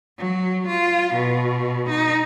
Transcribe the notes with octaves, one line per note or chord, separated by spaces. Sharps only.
F#3
F4
B2
D#4